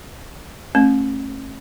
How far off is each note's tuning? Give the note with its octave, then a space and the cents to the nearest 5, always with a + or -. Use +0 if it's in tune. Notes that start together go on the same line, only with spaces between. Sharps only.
A3 +0 C#4 -40